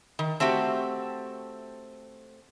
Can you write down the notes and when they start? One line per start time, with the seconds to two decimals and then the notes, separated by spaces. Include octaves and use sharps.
0.19 D#3
0.40 A3 C4 F#4 G4